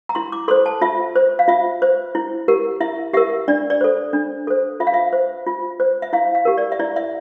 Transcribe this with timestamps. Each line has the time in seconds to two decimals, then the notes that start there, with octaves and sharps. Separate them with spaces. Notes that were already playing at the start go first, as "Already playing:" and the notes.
0.09 A#5
0.15 E4 C6
0.32 D6
0.48 A4 C5 C6
0.66 A5
0.81 F4 E5
1.15 C5
1.39 F5
1.48 F4 E5
1.82 C5
2.15 E4
2.48 G4 A#4
2.81 E4 E5
3.13 G4 A#4 E5
3.48 D4 D5
3.70 D5
3.81 A4 C5
4.13 D4
4.47 A4 C5
4.80 F4 E5
4.87 F5
4.94 E5
5.13 C5
5.47 F4
5.80 C5
6.02 E5
6.13 E4 F5
6.35 F5
6.45 G4 A#4
6.58 D5
6.72 E5
6.80 E4 D5
6.96 E5